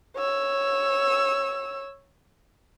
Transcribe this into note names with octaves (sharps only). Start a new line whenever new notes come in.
C#5 E6